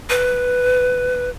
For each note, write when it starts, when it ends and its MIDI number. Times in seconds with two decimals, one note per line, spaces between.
0.10 1.30 71